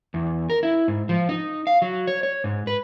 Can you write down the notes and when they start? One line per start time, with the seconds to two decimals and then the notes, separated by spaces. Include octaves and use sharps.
0.14 E2
0.50 A#4
0.63 E4
0.88 G#2
1.09 F3
1.29 D#4
1.67 F5
1.82 F#3
2.07 C#5
2.23 C#5
2.44 G#2
2.67 B4